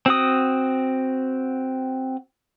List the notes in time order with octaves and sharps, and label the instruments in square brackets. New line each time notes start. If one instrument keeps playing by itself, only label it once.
[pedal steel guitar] C4 F#4 D#6